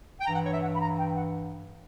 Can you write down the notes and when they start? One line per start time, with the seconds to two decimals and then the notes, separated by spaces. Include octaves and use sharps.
0.20 G5
0.26 G2 E3 A#5
0.35 F#5
0.44 C#5
0.53 E5
0.62 F#5
0.74 B5
0.81 A#5
0.98 G5
1.16 F#5